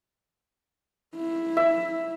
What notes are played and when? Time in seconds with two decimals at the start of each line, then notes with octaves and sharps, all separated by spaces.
1.17 E4
1.57 E5